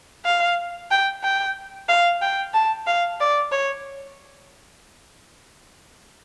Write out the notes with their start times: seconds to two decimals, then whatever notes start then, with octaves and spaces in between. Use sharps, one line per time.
0.25 F5
0.91 G5
1.23 G5
1.88 F5
2.22 G5
2.54 A5
2.87 F5
3.20 D5
3.52 C#5